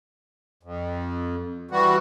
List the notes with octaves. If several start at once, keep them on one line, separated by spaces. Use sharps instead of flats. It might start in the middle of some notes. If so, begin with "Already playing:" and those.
F2
E3 G3 F#4